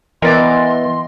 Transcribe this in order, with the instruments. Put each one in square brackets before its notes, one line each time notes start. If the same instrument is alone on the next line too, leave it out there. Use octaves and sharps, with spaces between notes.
[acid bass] E3 [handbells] B3 D#5 [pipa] A#4 D5 [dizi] C6